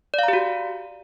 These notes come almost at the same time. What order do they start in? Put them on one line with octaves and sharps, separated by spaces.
D5 F5 A#5 G4 F#4